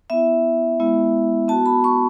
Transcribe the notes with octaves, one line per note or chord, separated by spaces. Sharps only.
B3 E4 E5
G#3 B3 E4
B3 F#4 A5
B5
C#6